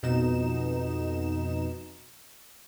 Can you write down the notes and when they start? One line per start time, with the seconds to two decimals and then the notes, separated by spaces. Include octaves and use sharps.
0.03 F2 B2 D#4 E7